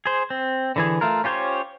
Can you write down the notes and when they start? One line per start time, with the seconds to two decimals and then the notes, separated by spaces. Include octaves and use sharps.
0.06 G#4 C5
0.30 C4
0.76 D3 E3 G#4
1.01 A3 F4 A#4
1.24 C#4 F4 G4 C5 C#5